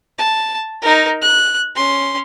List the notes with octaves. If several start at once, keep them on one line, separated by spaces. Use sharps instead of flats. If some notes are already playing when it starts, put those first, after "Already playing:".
A5
D#4 A#4
F#6
C#4 C6